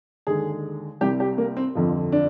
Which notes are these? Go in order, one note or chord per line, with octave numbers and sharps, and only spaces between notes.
D#2 D3 G#3 G#4
C2 C3 G3 G4
G4
A#3
C4
G1 F2 D3 F3
D4